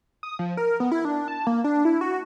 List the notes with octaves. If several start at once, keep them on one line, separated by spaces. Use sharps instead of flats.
D#6
F3
A#4
B3
E4
D4
A5
A#3
D4
E4
F#4